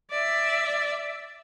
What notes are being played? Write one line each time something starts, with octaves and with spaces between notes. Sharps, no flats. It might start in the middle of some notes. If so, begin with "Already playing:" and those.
D5 E5